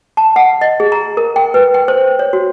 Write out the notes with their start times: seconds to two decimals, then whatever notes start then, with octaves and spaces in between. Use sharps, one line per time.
0.17 A5
0.36 F#5
0.61 D#5
0.80 G#4
0.92 A#5
1.17 A#4
1.36 G5
1.54 B4
1.74 G5
1.88 C5
2.19 C#5
2.33 F#4